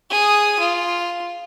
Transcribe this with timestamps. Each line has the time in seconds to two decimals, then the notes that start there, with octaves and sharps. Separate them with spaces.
0.10 G#4 D#6
0.60 F4